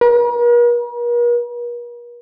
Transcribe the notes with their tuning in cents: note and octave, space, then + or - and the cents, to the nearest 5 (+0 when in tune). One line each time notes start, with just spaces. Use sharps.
A#4 +40